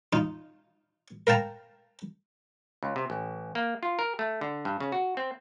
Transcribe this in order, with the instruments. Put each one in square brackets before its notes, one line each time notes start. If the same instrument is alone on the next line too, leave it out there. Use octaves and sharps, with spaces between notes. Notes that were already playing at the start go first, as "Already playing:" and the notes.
[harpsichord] D#4 F4
A#4 F5 G5 A5 A#5
[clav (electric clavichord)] C#2
C3
A1
A#3
F4
A#4
A3
D3
G2
C#3
F#4
C4